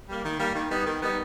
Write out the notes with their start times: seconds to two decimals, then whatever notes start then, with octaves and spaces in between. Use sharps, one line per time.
0.08 G3 A#3
0.24 D#3
0.39 G3 A#3
0.55 D#3
0.70 G3 B3 D#4
0.86 D#3
1.02 G3 B3 D#4